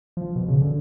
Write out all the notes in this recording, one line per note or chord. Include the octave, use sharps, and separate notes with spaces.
F3
B2
C#3
D3